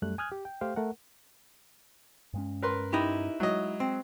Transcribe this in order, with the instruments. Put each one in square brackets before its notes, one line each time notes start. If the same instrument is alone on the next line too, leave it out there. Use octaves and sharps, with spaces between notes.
[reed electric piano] F#2 G3 A3 F#6
G#5 D#6 F6 F#6 G#6
G4
G5
A3 G4 C5 F5 G5
A3 A#4 F#5
[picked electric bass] G2 G#3 C#4
[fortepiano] A#4 B4 C6
[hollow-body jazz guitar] D#4 E4 G4
[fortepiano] F#3 D#5 [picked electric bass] G#3
[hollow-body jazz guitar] C4